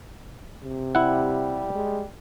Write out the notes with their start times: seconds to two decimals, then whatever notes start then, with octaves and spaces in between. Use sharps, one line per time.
0.63 C3
0.95 G3 E4 F#5
1.75 G#3